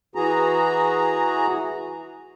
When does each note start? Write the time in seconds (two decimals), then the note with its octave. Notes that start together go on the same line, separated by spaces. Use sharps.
0.15 E3 F#4 G#4 A#5